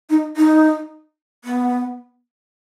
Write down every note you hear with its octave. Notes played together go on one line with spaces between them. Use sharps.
D#4
D#4
B3